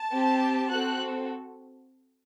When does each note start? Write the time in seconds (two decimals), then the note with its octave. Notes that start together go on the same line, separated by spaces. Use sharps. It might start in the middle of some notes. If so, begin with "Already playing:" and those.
Already playing: A5
0.12 C4 G4
0.69 C4 F#4 A4 F#6